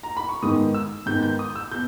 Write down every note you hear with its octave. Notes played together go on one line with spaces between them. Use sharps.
A#5
B5
C#6
G#2 D#3 G#3 B3 D#6
E6
G#2 D#3 G#3 B3 G6
G6
D#6
E6
B2 G6